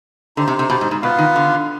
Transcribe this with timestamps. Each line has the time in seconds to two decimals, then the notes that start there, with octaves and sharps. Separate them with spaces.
0.37 D3 D#4 G4 C5
0.48 C3
0.59 C3
0.70 B2
0.81 G#2
0.91 G#2
1.02 B2 B3 F4 B4 F5
1.18 D#3
1.36 D3